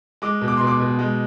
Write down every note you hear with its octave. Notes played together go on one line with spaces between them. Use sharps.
G#3 D6
B2
D6
B2 C6
D6
B2
G#3